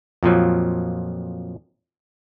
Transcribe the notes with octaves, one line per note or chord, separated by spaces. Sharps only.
F2 A#2 F3 F#3